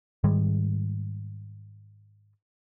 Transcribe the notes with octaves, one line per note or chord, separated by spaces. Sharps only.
G#2 D#3 G3 G#3